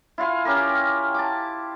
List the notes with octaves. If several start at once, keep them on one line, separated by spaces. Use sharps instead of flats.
E4 F4 F5 G#5
C#4 G4 A#4
A5 D6